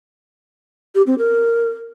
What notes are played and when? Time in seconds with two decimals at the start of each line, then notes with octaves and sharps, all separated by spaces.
0.95 G4
1.07 C4
1.18 A#4